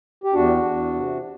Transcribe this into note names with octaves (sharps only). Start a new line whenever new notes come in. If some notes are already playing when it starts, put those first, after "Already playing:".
G4
E2 D4 F#4
E2
C3